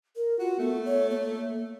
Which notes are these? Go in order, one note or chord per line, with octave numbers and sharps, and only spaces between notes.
A#4
F4 F#4
A3 B3
C#5
A#3